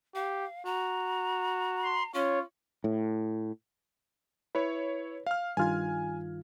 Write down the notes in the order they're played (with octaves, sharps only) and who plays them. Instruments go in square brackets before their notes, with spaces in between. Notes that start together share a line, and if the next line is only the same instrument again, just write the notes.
[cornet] G4 [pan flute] F5
[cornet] F#4 [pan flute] A#5
[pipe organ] C6
[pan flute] C#4 [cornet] F4 [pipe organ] C#5
[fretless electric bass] A2
[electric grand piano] E4 C#5 [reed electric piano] B4
[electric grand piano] F5 F6
[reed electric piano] G2 D#3 F4 [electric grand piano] G#5 F6 G#6